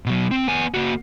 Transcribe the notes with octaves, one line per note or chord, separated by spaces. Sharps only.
B2 F#3
C4
B3 G#5
A#3 F#4